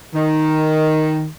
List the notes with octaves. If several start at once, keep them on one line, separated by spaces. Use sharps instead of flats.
D#3